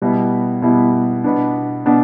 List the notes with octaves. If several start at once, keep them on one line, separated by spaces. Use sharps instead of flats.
B2 G3 B3 E4
B2 G3 B3 E4
B2 B3 D4
B2 B3 D4